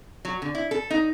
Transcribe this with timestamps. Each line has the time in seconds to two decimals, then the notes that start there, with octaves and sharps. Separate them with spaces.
0.25 F#3
0.42 D3
0.55 E4
0.71 A4
0.90 D#4